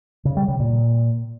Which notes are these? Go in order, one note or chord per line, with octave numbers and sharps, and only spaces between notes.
C#3
G3
C#3
A#2